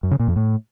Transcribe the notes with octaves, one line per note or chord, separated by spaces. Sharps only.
F#2
C#3
A#2
F2
A2